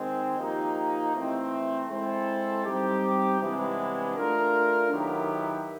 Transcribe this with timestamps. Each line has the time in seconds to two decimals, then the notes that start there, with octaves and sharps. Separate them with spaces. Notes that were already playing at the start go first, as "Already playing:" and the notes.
Already playing: D#3 G#3 C4
0.38 F3 A#3 D#4 G4
1.14 E3 A3 C4 E4
1.90 G#3 C4 E4 A4 C5
2.64 G3 C4 D#4 G4
3.41 C3 E3 G#3 B3 D4
4.15 A3 D4 F4 A#4
4.91 D#3 F#3 B3 E4 G4